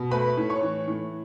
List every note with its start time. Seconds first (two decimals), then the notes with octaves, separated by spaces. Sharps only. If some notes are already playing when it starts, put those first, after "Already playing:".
Already playing: B2
0.11 A3 B4 B5
0.37 A2
0.49 C#5 C#6
0.62 E3
0.88 A2